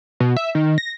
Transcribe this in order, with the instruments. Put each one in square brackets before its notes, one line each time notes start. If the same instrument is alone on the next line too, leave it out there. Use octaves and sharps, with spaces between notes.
[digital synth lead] B2
E5
D#3
A#6